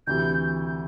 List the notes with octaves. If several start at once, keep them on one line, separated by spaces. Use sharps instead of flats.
D2 C3 E3 G6